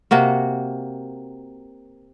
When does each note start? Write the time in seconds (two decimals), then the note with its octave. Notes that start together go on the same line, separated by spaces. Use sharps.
0.11 C3 A#3 F#4